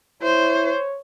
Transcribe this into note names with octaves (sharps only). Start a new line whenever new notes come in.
E4 C5 C#5